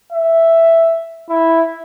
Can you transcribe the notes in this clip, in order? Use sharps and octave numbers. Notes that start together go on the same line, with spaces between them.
E5
E4